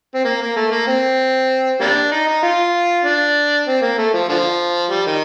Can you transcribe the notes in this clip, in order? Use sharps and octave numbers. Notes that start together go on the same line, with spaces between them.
C4
A#3
A#3
A3
A#3
C4
G3 A#3 D4
D#4
D#4
F4
D4
C4
A#3
A3
F3
D3 F3
G3
D#3